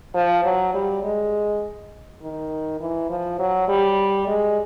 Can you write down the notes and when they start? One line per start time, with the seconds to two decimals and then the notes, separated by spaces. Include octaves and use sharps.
0.15 F3
0.44 F#3
0.74 G3
1.04 G#3
2.22 D#3
2.81 E3
3.10 F3
3.39 F#3
3.68 G3
4.28 G#3